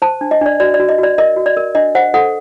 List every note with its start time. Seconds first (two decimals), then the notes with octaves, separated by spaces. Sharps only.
0.02 C5 A5
0.21 D4
0.31 D#5
0.41 D4 D5
0.60 F#4 D5
0.74 D5
0.80 F#4
0.89 D#5
0.98 F#4 D5
1.18 A#4 D#5
1.36 F#4
1.46 D5
1.57 A#4
1.75 D4 D#5
1.95 C5 F#5
2.14 A4 F#5